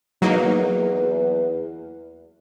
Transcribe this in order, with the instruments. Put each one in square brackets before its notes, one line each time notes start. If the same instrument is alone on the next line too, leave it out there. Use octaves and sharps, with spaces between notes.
[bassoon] E2 [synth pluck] F#3 A#3 D#4